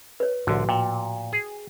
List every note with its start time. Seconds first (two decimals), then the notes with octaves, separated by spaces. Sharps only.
0.20 B4 C#5
0.47 C2 A2 D3 F3 F#4
0.69 A#2 G5
1.33 G#4